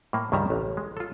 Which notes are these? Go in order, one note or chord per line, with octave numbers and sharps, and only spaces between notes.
A2 A#3
C#2 G2 D#3 G3 E5 A#5
A1
G#3
F4 A4